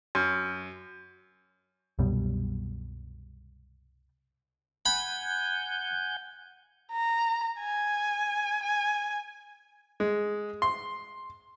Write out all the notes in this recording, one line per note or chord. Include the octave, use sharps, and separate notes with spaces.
F#2
C2 F#2 B2 G3
F#5 G#5 B5 G6
A#5
G#5
G#5
G#3
C6